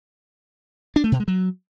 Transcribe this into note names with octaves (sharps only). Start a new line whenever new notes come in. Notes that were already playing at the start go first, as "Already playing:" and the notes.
D4
A3
B2
G#3
F#3